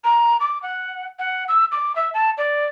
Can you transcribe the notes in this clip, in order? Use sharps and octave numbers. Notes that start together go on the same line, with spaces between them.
A#5
D6
F#5
F#5
E6
D6
E5
A5
D5